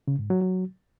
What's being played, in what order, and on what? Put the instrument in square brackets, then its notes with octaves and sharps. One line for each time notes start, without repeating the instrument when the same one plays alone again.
[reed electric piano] C#3
G#2
F#3
F#3